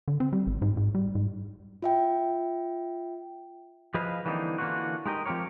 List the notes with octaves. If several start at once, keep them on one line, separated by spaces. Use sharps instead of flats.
D3
C4
G3
G#1
G#2
G#2
G3
G#2
F4 E5 G5
F3 G#4 B4 D#5 F5
D3 E3 G3 A#3 C4 D#4
D3 E3 A#3 C#4 F4 F#4
G#3 D#4 G4 A#4 D#5
F3 C4 G4 A#4 C#5